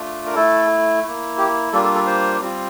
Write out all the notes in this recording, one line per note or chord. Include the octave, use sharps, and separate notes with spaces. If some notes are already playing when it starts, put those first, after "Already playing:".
Already playing: A3 D4 F4
A#4
A3 E4 A4
A#3 E4
G4
G3 A#3 D4 F4 A4
A4
A4
C5
G3 C4 F4